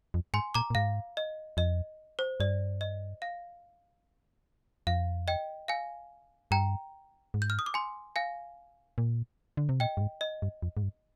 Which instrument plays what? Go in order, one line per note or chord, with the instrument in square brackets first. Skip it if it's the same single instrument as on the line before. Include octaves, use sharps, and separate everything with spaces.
[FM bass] F2
[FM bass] G#2 [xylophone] G#5 C6
[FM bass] A#2 [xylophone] A#5 D6
[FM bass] A#2
[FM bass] G#2 [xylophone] F5
[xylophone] D#5
[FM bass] F2 [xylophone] D#5
[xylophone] C5
[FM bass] G2 [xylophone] D5
[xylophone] D#5
F5
[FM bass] F2 [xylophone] F5
[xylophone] D#5 G5
F5 G#5
[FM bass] G2 [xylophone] G5 A#5
[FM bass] G#2
[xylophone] G6
F6
D#6
D6
G#5 C6
F5 G#5
[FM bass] A#2
D3
C3
[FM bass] A#2 [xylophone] D#5 G5
[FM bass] G2
G#2
[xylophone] D#5
[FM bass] G2
F2
G#2
G2